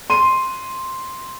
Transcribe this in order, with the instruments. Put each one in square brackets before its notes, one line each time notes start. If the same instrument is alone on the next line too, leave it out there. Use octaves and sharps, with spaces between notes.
[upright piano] C6 D#7